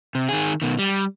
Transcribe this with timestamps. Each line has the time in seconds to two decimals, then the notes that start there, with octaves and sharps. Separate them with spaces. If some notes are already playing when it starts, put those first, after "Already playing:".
0.15 C3
0.29 D#3 G#4
0.62 B2 D#3
0.79 G3